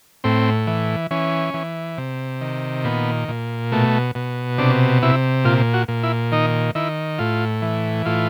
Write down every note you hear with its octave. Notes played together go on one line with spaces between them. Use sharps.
A2 C4
E3
E3 C#4
E3
C3
D#3
A#2 B3
A#2
B2 A3
B2
C3 D4
C3 E4
A#2 F4
F#4
A#2
E4
D#3 D#4
D#3 E4
A2 F4
E3
A2 F4